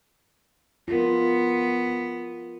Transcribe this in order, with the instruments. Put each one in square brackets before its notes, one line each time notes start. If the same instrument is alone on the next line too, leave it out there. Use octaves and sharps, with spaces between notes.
[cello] B3 [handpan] F4 A#4